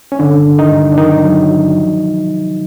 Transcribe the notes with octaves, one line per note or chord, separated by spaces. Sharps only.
C#4
G2 D3 D4
D3
D#3 D#4
G2
D4
D#3 F#3 D#4
F#3
F#3
F3